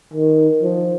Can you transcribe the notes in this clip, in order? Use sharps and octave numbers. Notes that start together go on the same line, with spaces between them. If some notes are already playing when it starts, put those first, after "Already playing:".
D#3
F3